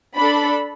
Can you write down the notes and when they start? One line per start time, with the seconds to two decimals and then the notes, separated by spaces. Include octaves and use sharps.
0.16 D4 A4 B5